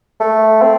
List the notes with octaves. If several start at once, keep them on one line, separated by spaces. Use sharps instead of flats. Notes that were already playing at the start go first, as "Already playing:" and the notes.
A3
C4